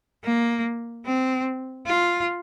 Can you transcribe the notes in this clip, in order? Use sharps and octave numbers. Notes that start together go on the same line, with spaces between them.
A#3
C4
F4